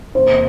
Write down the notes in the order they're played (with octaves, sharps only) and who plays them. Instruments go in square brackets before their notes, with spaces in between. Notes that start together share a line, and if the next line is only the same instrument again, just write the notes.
[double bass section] E2 C3 E3 A#3 C#4 [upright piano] C5